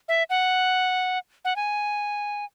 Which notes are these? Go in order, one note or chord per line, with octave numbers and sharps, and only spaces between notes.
E5
F#5
F#5
G#5